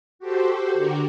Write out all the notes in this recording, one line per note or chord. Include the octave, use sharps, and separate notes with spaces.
F#4 G4 A4 C5
D3 F#4 G4 A#4